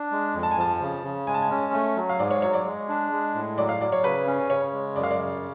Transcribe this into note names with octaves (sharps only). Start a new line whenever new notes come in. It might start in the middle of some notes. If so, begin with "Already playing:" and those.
Already playing: D4
G#3
F2
A5
G#5
F3 A5
C#3
C#3
G#3 G#5
A5
G#5
C#4
A3
F#3
F5
G#2 D5
C#5
F#3 C#5
D5
G#3
D4
G#3
A2
F#3 D5
F5
F#3 D5
C#5
C#3 B4
C#4
C#3 C#5
G#3
F#2 D5
F5
D5
C#3